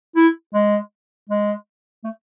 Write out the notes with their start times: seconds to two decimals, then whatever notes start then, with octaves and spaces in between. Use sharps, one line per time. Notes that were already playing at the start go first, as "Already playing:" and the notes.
0.16 E4
0.54 G#3
1.30 G#3
2.04 A3